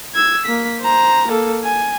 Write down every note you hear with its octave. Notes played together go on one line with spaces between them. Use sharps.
E6 G#6
A#3 B6
C5 A#5
A#3 A4
G#5